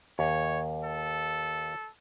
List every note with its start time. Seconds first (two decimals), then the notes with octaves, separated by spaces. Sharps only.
0.19 D#2 C#5
0.84 A4